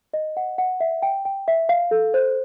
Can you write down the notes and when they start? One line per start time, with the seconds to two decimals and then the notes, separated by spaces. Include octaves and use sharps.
0.14 D#5
0.37 F#5
0.58 F#5
0.80 E5
1.02 G5
1.25 G5
1.48 E5
1.69 F5
1.91 A4
2.14 C5